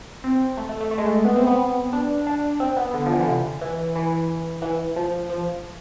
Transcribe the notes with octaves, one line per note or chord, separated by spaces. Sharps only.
C4
A3
A3
A3
A3
G#3
A3
B3
C4
B3
D4
D4
C4
B3
D3
F3
E3
D3
C3
E3
E3
E3
F3
F3